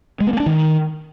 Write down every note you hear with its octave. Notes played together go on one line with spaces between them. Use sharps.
G#3
B3
A#3
D4
D#3